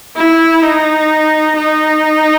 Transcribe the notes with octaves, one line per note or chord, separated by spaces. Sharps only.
E4
D#4
D#4